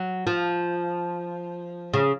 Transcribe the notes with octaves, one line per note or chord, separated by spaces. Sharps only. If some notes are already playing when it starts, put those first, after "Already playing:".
Already playing: F#3
F3
C#3